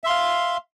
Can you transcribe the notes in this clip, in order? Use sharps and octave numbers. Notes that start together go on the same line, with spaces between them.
E5 F5 C6